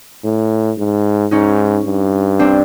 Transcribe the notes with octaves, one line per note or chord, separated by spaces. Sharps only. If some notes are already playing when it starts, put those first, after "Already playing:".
A2
G#2
G#2 C#4 D#4
G2
C4 D4